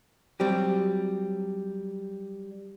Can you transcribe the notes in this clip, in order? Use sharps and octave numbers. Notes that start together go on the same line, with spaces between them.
F#3 G3 C4 G4